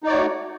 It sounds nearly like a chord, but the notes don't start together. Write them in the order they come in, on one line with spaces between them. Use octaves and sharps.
D#4 D5 C#5 F#4 A3